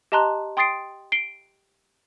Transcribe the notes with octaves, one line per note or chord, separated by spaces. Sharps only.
G4 D#5 A5 A#5 C6 F#6
G5 C6 D#6 A6 C7 D7
C7 D7 G7